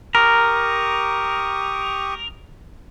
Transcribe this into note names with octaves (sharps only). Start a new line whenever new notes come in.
G4 A#4 C#6 D#6